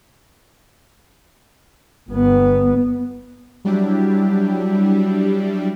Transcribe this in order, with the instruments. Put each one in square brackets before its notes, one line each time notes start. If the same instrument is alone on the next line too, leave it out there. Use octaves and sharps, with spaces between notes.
[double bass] G1 B3
[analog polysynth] F#3 G3 D4 E4 G4